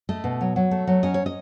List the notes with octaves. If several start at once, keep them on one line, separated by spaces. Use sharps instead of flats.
A3 D#5
B2
F#3
F#3
A3
F#3
C#4 D#5
C#5
D#5